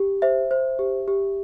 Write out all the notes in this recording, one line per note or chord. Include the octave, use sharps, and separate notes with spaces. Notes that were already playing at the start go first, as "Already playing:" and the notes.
Already playing: G4
C5 E5
C5
G4
G4